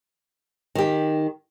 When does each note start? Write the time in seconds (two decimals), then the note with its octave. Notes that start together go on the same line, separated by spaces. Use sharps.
0.75 D#3 G4